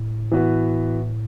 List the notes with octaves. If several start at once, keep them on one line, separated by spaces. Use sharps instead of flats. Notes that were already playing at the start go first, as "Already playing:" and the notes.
Already playing: A2
E3 B3 F#4